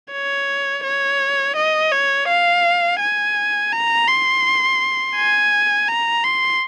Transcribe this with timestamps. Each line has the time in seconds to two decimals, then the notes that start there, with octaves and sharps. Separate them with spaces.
0.12 C#5
0.84 C#5
1.56 D#5
1.92 C#5
2.29 F5
3.00 G#5
3.72 A#5
4.08 C6
5.16 G#5
5.88 A#5
6.24 C6